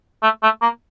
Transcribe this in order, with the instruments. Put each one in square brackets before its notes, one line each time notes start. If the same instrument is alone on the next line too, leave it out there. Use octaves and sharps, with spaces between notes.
[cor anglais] A3
A3
A#3